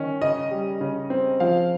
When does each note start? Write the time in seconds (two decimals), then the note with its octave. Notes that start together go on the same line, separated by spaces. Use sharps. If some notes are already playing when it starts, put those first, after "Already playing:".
Already playing: D#3 C#4
0.21 C#3 D#5
0.51 G3
0.81 C#3
1.10 C4
1.40 F3 F5